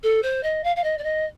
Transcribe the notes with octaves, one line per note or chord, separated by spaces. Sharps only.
A4
C5
D#5
F5
F5
D#5
D5
D#5